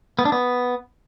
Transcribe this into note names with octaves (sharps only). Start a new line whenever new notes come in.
B3
D4
B3